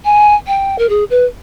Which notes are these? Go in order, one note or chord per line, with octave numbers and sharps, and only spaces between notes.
G#5
G5
A#4
G#4
B4